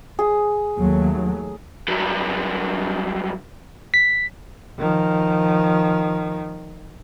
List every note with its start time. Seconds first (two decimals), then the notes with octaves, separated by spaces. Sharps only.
0.19 G#4
0.79 D#2 F#3 A3
1.88 G2 F#3
3.94 B6
4.79 D#3 F3